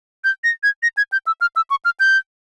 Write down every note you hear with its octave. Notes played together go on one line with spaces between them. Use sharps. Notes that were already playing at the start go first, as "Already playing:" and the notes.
G6
A#6
G#6
A#6
G#6
G6
E6
F6
E6
C#6
F6
G6